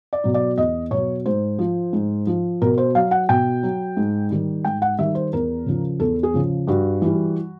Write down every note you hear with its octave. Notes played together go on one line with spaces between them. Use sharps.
D5
B2 F#3
D5
E2 D#5
B2 F#3 C#5
G#2 C5
F3
G#2
F3
B2 A#4
C5
F#3 F5
F#5
B2 G5
F#3
G#2
D#3 G3
G#2 G5
F#5
D#3 G3 E5
C5
E2 A#4
C#3 F3
E2 A4
G#4
C#3 F3
G2 F#4
E3 G3